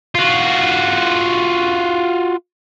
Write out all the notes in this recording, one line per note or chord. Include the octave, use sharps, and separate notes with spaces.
F4 F#4